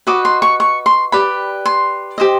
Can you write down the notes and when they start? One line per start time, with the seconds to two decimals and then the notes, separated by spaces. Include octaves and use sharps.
0.07 F#4 B4 D#5 D6
0.25 C6
0.42 C#6
0.60 C#6
0.86 C6
1.12 G4 B4 D5 B5
1.65 C6
2.18 G4 C5 D#5